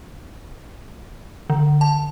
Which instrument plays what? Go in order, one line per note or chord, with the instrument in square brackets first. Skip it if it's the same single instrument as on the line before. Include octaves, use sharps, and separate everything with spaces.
[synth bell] D3
A5